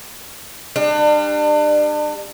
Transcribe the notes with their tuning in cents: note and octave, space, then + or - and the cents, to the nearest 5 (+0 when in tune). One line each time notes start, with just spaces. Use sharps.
G3 +25 D4 +35